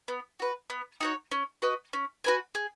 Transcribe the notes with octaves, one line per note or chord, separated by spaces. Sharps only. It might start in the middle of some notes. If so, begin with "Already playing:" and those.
B3
F#4 B4
B3
D#4 F#4 C#5
C#4
F#4 B4 D#5
C#4
F#4 B4 G#5
G#4